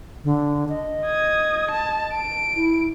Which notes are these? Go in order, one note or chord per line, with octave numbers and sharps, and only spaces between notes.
D3
D#5
D#6 G#6
A5
D7
E4